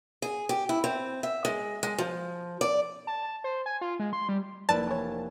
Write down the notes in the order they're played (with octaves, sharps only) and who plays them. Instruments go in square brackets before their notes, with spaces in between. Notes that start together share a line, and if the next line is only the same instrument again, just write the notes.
[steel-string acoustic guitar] G#4
G4
E4
C4
E5
G#3
G#3
F3
D5
[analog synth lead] A5
A5
C5
G#5
F4
G#3
C6
G3
[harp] F1 A#3 [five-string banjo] E4 B4 D5 [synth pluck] A5
[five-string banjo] E3 C#5